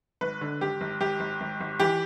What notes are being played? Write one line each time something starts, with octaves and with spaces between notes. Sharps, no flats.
G#1 B4
D3
G#1 G4
G#1
G#1 G4
G#1
G#1
G#1
E3 G4